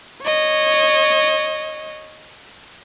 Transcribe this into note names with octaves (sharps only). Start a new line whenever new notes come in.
C#5 D#5